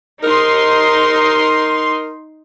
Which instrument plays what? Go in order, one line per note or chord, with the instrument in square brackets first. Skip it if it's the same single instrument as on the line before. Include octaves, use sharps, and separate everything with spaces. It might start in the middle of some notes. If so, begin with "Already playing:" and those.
[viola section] D#4 C6 [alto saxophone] A#4